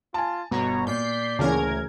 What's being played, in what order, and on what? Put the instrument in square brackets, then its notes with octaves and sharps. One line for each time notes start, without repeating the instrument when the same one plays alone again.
[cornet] F4 [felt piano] G#5 A5
[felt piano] G1 [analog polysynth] B2 C#5 [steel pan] B3 [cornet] A#5
[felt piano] A#2 [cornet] D5 [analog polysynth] G6 B6 C7
[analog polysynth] D2 A#4 G#6 [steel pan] C#3 E3 C#4